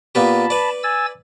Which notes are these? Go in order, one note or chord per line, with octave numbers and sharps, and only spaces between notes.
A#2 B3 G4 A5 B5
B4 D5
G#5 E6 A6